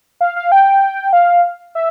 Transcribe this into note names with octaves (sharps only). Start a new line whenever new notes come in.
F5
F5
G5
F5
E5